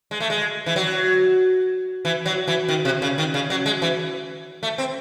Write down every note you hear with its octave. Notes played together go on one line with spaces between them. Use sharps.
G#3
A3
G#3
E3
F#3
E3
F#3
E3
D#3
C3
C#3
D#3
C#3
F#3
G#3
E3
A3
C4